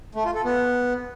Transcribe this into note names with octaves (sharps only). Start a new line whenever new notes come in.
A3
F4
A4
B3